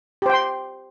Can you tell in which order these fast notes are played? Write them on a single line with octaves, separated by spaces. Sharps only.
G4 C5 G5 C6